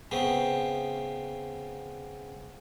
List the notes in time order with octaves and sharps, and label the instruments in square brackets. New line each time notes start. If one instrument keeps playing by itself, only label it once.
[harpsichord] C#3 B3 C4